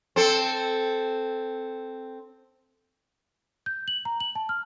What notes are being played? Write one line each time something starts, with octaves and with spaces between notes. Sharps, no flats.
C4 A4
G6
F#7
A#5
F#7
A5
F6